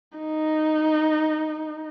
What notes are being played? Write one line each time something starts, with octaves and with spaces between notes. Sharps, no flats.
D#4